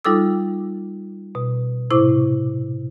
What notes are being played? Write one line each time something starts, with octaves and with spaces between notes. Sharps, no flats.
G3 D#4 F4 A4 D6 E6
B2
A2 C3 E4 C5 D6